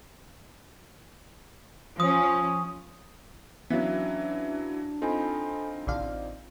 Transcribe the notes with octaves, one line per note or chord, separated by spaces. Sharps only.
F3 C#4 D#6
E3 F#3 B3 C#4 D4 E5 F5
C4 D#4 F4 A4 G#5 B5
A1 D3 D5 F5